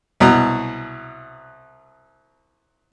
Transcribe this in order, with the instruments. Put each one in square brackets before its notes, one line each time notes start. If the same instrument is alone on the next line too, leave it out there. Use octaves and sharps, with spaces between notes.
[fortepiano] C2 B2 F#3